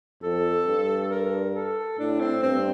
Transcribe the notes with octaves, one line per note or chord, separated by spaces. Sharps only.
F2 A4
G2
A#4
A4
A2 D4
C4
G2 C4